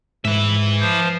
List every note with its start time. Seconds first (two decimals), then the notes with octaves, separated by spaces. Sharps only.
0.25 G#2 B4 E5
0.81 F3 C5